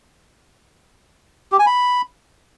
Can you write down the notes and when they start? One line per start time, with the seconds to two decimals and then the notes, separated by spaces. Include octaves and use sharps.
1.52 G4
1.59 G#5
1.66 B5